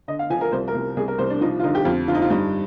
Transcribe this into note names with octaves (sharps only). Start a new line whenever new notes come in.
D3 D#5
F5
F3 G#5
A#4
C2 C5
A#4
C2
C2 G#4
A#4
C2 C5
D4
F3 D#4
F4
D3 D#4
G4
F2 F4
D3 F4
D#4
F4
G2 D#4